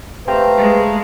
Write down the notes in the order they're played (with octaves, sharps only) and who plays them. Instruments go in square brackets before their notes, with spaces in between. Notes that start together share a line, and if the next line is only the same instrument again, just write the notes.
[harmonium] A3 F5 A#5 [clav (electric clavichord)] G4 C5 G5 [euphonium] B4
[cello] G#3